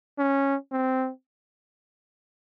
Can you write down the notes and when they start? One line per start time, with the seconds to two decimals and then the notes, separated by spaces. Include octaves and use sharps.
0.18 C#4
0.72 C4